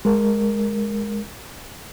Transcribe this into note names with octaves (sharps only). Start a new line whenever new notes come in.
G#3 A#4